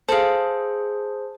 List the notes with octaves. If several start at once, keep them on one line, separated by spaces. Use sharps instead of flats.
G#4 A4 C5 F5